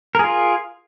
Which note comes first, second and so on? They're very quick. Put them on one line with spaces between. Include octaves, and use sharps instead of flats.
A#4 G#4 F4